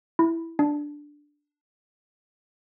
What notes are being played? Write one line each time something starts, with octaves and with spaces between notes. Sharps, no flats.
E4
D4